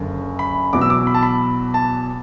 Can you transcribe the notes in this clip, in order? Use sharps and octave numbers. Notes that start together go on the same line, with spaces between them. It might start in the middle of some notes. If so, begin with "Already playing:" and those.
Already playing: F#1 F#2 D3
B5
E2 B2 F#3 D6
E6
D6
B5
A5
B5
A5